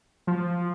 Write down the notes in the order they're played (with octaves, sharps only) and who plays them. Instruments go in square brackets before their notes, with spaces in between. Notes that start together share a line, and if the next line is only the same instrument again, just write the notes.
[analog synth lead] F3